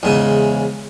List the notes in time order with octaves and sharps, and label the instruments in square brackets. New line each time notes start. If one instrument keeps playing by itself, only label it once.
[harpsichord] E2 G#2 C#3